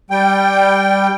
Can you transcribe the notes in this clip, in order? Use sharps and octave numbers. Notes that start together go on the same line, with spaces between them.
G3 G5